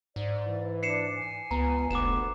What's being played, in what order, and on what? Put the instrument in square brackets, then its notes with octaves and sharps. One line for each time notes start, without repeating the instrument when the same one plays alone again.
[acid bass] G#2 [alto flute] D5
[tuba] E3
[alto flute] D4 [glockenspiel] C7 C#7 E7
[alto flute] G#5
[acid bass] C#2 [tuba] B3 [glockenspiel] A#5
[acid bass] F1 [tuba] D2 [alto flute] B3 [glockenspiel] D6 E7